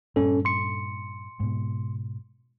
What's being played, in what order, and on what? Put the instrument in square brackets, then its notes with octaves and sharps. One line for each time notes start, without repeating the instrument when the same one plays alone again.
[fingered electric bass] G2 A#2 [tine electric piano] C#4 A4
[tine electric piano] C6 C#7
[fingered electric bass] G#2 B2